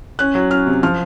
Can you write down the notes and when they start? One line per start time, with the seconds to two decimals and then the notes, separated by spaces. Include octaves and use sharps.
0.19 C#4 F#6
0.35 F#3
0.50 C#4 F6
0.66 C3
0.83 F3 F6